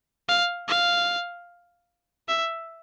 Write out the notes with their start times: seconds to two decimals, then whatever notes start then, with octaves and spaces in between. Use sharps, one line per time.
0.29 F5
0.68 F5
2.28 E5